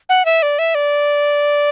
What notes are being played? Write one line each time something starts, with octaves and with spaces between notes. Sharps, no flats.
F#5
E5
D5
E5
D5